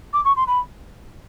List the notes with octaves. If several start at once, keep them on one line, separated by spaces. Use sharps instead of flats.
D6
C#6
C6
B5